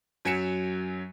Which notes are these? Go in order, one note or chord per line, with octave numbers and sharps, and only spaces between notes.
F#2 F#3 G#5 B6 C#7 E7